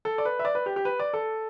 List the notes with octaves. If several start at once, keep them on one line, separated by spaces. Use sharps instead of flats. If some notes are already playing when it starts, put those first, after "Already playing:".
A4
D5
B4
E5
D5
B4
G4
G4
B4
D5
A4